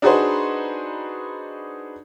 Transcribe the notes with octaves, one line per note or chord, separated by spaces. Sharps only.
D4 D#4 F#4 G#4 B4 C5